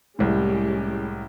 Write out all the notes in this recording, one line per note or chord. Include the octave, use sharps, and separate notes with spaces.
C2 A2 G#3 C#4 G4